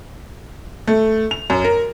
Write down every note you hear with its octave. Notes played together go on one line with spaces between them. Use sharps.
A3
F7
F#2
A#4